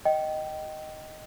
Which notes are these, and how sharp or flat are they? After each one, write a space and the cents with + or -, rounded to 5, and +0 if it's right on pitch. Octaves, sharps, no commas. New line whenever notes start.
D#5 +0 G5 -20